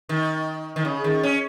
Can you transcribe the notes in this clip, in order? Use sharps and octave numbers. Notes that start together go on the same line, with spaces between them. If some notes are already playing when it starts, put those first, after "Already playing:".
D#3
D#3
C#3
D#3
C#4